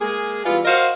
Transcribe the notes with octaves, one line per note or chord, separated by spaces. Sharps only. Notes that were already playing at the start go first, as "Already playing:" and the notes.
G#3 A#3 G#4
E3 G3 B3 F4
F#4 A#4 C5 D#5 F5